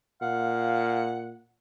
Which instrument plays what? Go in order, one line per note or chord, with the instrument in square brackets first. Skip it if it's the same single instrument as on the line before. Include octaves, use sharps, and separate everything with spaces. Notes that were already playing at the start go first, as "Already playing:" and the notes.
[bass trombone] A#2 [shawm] F5 [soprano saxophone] F#5